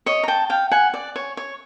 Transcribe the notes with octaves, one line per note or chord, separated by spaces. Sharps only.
C#5 D#5
A#5
G5 A5
F5 G5
F#5 G#5
D5
C#5
C#5